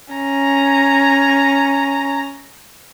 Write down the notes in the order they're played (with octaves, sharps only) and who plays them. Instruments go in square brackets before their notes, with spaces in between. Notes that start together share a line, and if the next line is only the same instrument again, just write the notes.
[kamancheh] C#4 A#5